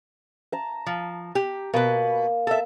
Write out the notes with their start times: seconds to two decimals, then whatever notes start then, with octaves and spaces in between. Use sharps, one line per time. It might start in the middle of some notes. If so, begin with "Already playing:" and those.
0.52 A5 A#5
0.86 F3
1.35 G4
1.74 B2 A#3 B4
2.47 A4 E5